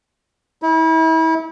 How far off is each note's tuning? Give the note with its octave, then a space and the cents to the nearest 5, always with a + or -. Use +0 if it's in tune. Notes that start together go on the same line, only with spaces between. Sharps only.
E4 -35